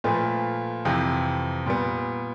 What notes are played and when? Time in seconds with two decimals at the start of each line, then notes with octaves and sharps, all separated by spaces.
0.04 A#2 F3 A3 B4
0.85 F2 C3 E3
1.66 A#2 G3 B3